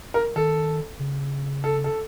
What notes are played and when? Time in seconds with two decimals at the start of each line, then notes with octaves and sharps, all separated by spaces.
0.14 A#4
0.35 D#3 A4
0.99 C#3
1.64 A4
1.84 A4